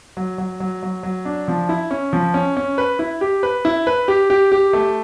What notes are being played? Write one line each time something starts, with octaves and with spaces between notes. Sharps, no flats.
F#3
F#3
F#3
F#3
F#3
D4
F3
E4
C#4
F3
C#4
C#4
B4
E4
G4
B4
E4
B4
G4
G4
G4
A3